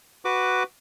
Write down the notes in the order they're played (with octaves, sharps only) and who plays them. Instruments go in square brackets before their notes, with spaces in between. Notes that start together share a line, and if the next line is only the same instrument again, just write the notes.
[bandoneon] F#4 B4 D6